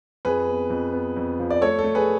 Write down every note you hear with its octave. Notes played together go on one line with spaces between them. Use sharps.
F2 G#4 B4
B3
F2
B3
F2
F3
D5
A3 A4 C#5
A4
A3
G#4 B4